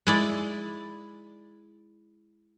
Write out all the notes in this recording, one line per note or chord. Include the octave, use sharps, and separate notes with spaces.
G#3 E4 D5